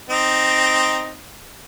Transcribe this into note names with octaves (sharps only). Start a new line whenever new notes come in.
C4 D#4